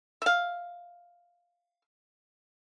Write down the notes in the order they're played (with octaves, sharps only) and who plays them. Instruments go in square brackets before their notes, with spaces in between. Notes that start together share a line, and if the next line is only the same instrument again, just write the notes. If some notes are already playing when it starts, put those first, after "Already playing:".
[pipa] E5 F5